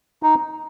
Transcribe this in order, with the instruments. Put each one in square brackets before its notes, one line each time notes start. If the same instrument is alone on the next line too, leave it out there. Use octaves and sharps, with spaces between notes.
[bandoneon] D#4